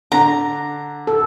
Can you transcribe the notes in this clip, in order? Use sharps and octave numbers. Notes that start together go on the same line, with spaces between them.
D3 D4 A#5
A4